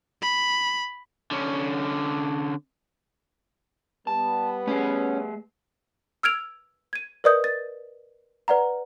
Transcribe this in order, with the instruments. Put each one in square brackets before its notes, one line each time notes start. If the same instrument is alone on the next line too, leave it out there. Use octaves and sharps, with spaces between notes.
[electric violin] B5
[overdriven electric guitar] D3 C#4
[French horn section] G3 B3 [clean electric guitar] A5
[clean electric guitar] A3 G#4 [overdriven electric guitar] C#4
[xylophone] E6 F6 G#6 D7 F7
G#6 D#7
A#4 B4 D5 D#5 D#6 G6
A6
B4 D5 F#5 A#5